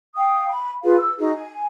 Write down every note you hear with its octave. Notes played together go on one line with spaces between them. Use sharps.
F5 G5 D#6
B5
F4 G#4 B4 F5
E6
D#4 F#4 G#4
G#5